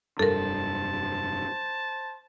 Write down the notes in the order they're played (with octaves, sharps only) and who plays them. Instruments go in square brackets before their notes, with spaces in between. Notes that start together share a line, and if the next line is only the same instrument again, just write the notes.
[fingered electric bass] F1 G2 D4 [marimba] A4 A#4 [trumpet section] C5 A5